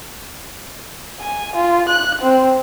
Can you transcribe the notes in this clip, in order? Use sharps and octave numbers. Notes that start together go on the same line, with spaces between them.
G#5
F4
F#6
C4